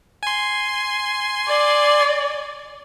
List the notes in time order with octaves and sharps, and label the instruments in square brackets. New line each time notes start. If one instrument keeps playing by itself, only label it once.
[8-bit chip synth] G#5 C6
[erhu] D5